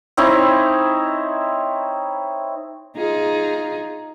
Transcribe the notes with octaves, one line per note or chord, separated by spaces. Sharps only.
C4 D#4 E4 C#5
D#4 F4 G#4